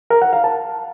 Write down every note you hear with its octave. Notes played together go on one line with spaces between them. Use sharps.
A#4
F#5
F5
A5